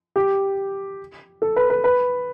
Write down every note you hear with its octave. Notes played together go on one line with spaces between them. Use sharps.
G4
A4
B4
B4
B4